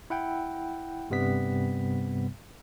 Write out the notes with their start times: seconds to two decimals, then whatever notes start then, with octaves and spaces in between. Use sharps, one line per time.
0.10 E4 F#5 G5
1.10 G2 C3 G3 B3 B6